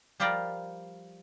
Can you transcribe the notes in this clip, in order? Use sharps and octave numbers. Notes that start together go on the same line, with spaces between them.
F3 G3 F4 G4 A#4 D5